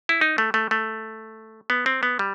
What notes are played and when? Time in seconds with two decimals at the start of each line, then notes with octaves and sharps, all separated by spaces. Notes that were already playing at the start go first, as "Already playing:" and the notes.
0.09 E4
0.21 D#4
0.38 A3
0.54 A3
0.71 A3
1.70 B3
1.86 C4
2.03 B3
2.19 G3